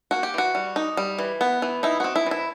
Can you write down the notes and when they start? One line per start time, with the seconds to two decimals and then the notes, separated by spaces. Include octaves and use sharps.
0.11 A#3 F#4
0.23 G4
0.34 E3 F#4
0.55 G3
0.76 D#4
0.97 G3
1.19 E3
1.41 B3
1.62 E3
1.83 D#4 E4
2.00 C4 F#4
2.16 E4
2.26 E3 E4